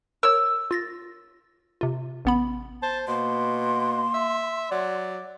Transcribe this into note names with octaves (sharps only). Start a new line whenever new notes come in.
A#4 C#5 E6
F4 A6 A#6
C3 F4
A1 B3 B5
C5 A5
B2 A#3 C6
E5
F#3 D5